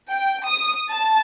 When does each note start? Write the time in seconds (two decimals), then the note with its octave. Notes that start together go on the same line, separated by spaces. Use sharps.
0.10 G5
0.47 D#6
0.90 A5